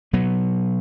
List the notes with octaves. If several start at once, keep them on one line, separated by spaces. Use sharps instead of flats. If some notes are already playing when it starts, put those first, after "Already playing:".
B2 F#3 B3